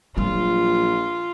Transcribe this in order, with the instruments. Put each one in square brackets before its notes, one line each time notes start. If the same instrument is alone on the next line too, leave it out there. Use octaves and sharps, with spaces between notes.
[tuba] A#1 [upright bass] F#3 G3 [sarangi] F4